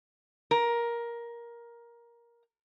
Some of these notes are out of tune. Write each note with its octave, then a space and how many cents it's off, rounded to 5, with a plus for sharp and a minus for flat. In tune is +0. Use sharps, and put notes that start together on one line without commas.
A#4 +15